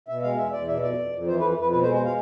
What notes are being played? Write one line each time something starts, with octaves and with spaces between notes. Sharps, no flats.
B2 E5
G#3 F5
E2 E5
E2 D5
B2 E5
F2 D5
F2
F2
E3 C5
B4
F2
F2 B4
B2 B4
C5
G#3
C5
G#3 F5